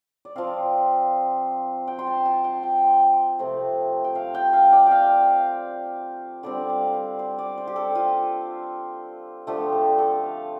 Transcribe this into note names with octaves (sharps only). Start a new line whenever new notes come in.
D5
F3 C4 F5
G5
C6
A5
A5
G5
G5
C3 F3 A3 C4
G5
F5
G5
F5
D5
F5 G5
D3 G3 C4 D5
F5
C5
C5
D5
C5
G4
A4
F4
D3 F3 A3 G4
A4
A4
F5